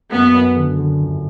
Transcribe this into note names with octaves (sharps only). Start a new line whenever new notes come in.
F#2 B3
F#2
D3
D3
G1